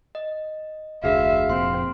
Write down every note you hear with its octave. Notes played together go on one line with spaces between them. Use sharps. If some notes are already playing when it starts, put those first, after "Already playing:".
D#5
F1 D2 D3 F#4 G#4 B4 E5 F5
F1 F2 A#2 C4 C6